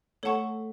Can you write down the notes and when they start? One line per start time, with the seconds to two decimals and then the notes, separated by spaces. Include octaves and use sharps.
0.23 A3 A4 C#5 F#5 A5 C#6